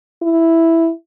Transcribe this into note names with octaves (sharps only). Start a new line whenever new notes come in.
E4